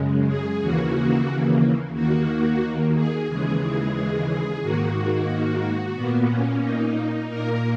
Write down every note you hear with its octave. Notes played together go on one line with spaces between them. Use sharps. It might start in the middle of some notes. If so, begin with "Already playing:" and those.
Already playing: F#2 C#3 G#3
G#4
D#2 C#3 E3 A#3 F#4
D#2 D#3 A#3 F#4
G#4
D#2 C#3 E3 G#3 G#4
G#4
G#4
G#4
G#2 D#3 A#3 F#4
A#2 A#3 B3
C#4
D#4
A#2 A#3 A#4